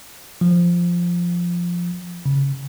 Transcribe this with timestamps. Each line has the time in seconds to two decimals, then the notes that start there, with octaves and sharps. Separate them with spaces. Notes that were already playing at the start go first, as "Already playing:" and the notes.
0.41 F3
2.26 C#3